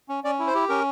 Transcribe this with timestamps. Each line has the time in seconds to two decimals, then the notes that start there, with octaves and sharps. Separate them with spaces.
0.09 C#4
0.24 C#4 D5
0.39 E4
0.47 C5
0.55 G4
0.69 C#4 A#4